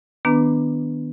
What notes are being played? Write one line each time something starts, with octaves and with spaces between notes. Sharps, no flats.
D#3 B3 D4 B4 A#5 D6